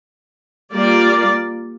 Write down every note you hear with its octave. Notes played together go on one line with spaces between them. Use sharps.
G3 A#3 F4 A#4 D5